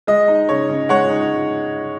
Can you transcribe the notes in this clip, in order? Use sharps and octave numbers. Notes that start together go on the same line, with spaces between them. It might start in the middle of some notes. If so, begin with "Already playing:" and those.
G#3 D#5
D#4
C#3 C#5
C#3
G#3 C#5 F#5
D#4